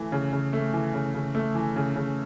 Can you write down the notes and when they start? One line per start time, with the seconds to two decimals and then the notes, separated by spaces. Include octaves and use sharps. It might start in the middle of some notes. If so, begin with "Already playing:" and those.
Already playing: E3 A3
0.12 C#3
0.32 C#3
0.53 A3
0.73 E3
0.94 C#3
1.14 C#3
1.35 A3
1.55 E3
1.76 C#3
1.96 C#3